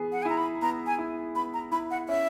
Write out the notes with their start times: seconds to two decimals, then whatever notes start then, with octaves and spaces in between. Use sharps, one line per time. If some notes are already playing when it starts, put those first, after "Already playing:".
Already playing: E3 B3 G#4
0.12 F#5
0.22 G#5
0.25 E4 A#5
0.37 B5
0.62 B3 A#5
0.86 G#5
0.99 E4
1.35 B3 B5
1.54 A#5
1.72 E4 B5
1.91 F#5
2.08 C#4 E5